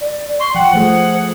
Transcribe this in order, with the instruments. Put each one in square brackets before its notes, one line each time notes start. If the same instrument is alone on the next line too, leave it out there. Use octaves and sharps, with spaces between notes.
[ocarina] D5
[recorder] C6 [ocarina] C#6
[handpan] F3 [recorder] F#5 [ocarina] G5
[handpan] F3 A3 G#4 [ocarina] C5